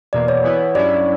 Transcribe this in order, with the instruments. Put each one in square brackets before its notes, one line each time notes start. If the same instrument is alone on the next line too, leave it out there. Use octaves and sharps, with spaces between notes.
[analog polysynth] E2 B2 A#3 [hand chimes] D5
[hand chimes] C#5
[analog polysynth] E3 B3 E4
[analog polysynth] G2 F#3 C#4 E4 [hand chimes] D5